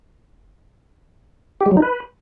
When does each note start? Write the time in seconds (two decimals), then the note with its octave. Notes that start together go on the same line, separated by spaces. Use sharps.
1.61 G4
1.66 G#3
1.71 F#3
1.77 D#4
1.82 B4